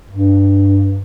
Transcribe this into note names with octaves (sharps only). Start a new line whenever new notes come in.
G2